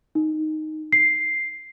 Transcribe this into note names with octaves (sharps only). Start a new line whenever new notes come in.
D#4
C7